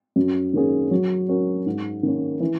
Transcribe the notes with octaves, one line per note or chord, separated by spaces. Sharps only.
F#2
D#3 A#3 C#4 G#4
F#3
C#4 F#4 A#4
G#2
D#3 A#3 C#4
E3